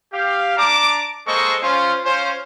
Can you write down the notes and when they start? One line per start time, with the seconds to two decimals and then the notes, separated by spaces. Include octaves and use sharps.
0.13 G4 F5
0.57 D4 A5 A#5 D6
1.27 G#3 A#3 A4 C5 D#5 C#6
1.63 C#4 F4 C5
2.05 C#4 F4 C5